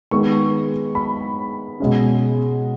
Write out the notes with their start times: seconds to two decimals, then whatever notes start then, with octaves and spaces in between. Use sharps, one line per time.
0.11 D#3 G#3 B3 C#6
0.95 B5
1.80 B2 G#3 C#4